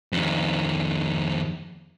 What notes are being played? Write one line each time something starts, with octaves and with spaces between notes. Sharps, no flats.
F2 D#3